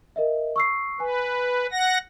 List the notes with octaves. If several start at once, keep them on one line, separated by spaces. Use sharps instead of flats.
A#4 D#5 E5
C#6 E6 C7
B4 G#5
F#5 A#6